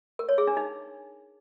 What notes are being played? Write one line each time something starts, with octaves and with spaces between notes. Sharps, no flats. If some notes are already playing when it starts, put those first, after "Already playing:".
A#4
C#5
G#4
D4
D#4